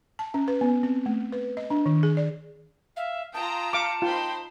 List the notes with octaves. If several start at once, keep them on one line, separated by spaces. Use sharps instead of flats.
A5
C#4
B4
B3
C4
A3
B4
D#5
D4
D#3
G#4
D5
E5 F5
F4 G5 A5 A#5 D#6
F5 D6 C#7
D#4 F4 C5 G5 B5